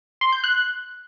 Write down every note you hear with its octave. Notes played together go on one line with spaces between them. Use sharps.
C6
G6
F#6